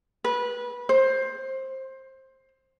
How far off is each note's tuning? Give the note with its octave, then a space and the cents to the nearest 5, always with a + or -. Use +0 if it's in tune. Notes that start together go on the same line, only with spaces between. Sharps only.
B4 -20
C5 +15